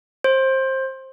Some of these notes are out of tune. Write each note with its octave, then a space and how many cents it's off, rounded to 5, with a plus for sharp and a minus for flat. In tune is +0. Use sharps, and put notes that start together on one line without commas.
C5 +20